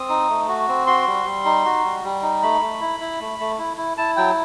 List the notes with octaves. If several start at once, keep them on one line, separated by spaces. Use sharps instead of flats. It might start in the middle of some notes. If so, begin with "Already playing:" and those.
Already playing: C4 D#6
D#4
A3
F#4
C4
F#4 C6
G3
G3
D#4
F#4
G3
G3
D#4
A3 B5
A3
E4
E4
A3
A3
E4
E4
E4 A5
F#3 G5